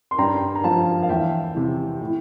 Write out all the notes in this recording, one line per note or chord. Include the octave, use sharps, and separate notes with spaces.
C6
G2 G5 A#5
A#5
F3 F5 A5
F5
E2 E5 G5
C3 E3
A2